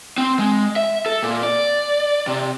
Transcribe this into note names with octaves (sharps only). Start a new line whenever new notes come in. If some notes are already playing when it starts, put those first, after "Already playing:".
C4
G#3
E5
A4
A#2
D5
C3